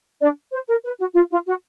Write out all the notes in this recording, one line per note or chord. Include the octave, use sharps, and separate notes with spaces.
D4 D5
C5
A#4
B4
F#4
F4
F4
F#4